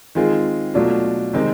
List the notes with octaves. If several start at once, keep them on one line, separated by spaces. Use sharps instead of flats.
D#3 G#3 C4 F4 G#4
B2 F#3 A3 D4 F4
C3 D#3 G#3 C4